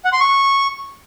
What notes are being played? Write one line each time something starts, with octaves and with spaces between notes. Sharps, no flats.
F#5
C6
C#6